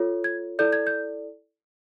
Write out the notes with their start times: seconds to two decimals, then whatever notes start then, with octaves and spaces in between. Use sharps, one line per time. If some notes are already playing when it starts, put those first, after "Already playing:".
Already playing: F4 A4 C#5
0.24 G#6
0.59 E4 A4 D5 G6
0.73 G#6
0.87 G6